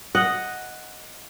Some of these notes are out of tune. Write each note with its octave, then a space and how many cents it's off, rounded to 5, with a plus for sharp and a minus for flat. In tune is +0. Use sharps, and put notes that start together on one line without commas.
D#5 +0 F#5 +0